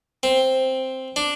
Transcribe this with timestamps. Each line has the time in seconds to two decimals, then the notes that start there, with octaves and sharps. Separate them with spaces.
0.23 C4
1.16 D4